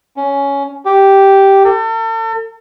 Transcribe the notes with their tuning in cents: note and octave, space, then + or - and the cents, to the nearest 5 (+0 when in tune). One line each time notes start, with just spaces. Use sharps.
C#4 +10
G4 -5
A4 +40